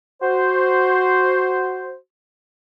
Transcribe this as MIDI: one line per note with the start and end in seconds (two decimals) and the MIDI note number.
0.21 1.95 66
0.21 1.95 72